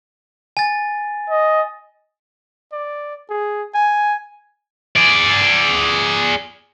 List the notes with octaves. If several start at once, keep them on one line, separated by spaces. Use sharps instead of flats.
G#5 A6
D#5
D5
G#4
G#5
G#4 D5